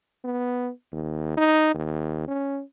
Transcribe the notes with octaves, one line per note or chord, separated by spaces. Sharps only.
B3
D#2
D#4
D#2
C#4